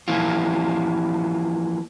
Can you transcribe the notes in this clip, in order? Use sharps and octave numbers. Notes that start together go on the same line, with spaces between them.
E3 F3 A#3 E4 F4